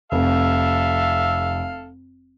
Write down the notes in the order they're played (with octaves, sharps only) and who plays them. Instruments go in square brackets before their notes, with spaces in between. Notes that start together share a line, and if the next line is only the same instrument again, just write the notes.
[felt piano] F1 [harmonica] A4 E5 F5